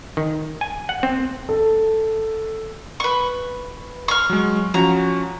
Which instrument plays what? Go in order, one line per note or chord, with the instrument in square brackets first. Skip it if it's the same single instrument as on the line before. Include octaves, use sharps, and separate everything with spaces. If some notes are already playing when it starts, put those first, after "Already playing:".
[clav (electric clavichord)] D#3
G#5
F#5
C4
[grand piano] A4
[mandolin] B4 C#6
C#6 F6
[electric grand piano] F#3 G#3
[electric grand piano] F3 C#4 F#4 [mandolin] A#5